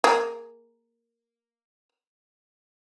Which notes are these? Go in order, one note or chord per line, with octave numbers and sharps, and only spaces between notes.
A#3 G#4